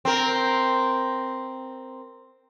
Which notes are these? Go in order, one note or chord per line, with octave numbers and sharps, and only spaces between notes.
C4 A#4